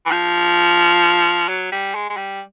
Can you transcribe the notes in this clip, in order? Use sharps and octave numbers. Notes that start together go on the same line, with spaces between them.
E3
F3
F#3
G3
G#3
G#3
G3